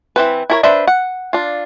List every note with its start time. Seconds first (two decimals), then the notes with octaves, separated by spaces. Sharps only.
0.16 E3 C4 B4
0.50 E4 A#4 C#5
0.63 D4 B4 C5 E5
0.87 F#5
1.33 D4 F4